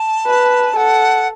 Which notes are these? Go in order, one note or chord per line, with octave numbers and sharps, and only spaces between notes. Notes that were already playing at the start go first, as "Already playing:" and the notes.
Already playing: A5
B4
A4 F#5